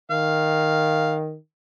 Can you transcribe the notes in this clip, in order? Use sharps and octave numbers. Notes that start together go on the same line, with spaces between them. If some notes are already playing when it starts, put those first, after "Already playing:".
D#3 F5